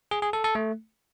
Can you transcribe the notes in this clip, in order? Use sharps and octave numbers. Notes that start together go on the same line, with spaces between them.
G#4
G#4
A4
A4
A3